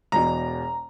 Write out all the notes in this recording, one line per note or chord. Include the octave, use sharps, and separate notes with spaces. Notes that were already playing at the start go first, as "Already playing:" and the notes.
E1 E2 B2 A#5